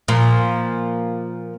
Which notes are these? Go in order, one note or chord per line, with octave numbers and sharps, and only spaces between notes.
A#2 F3